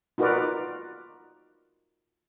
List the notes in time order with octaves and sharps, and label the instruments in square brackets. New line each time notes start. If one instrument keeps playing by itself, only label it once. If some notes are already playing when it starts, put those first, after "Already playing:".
[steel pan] D#4 F4 F#4 A#4 B4 D5